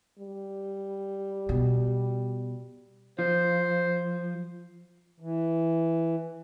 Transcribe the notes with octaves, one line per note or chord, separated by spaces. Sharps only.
G3
B2
F3 C5
E3